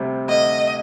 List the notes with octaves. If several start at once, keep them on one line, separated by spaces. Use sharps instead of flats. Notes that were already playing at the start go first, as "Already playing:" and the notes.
Already playing: D2 C3 G3 C4
D2 D#5